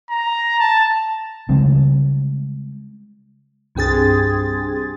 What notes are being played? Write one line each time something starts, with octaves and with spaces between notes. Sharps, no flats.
A#5
A5
C#3 G3 G#3 C4
C2 G2 C4 G#4 A6